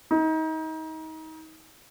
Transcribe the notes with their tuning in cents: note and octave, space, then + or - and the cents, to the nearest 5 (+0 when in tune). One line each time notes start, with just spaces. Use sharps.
D#4 +30